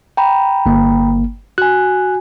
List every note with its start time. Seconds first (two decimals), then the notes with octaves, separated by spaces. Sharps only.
0.17 G5 A#5 B5
0.66 G1 A#3
1.58 F#4 G#5 F#6